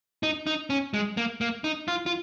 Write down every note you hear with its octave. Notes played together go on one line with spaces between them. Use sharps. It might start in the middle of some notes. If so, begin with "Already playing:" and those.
D#4
D#4
C#4
G#3
A#3
A#3
D#4
F4
F4